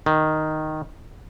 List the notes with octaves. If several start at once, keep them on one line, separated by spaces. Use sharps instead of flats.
D#3